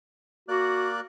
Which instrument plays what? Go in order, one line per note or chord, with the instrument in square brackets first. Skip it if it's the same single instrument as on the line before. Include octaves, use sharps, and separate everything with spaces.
[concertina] A#3 D5 F#6 [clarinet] F#4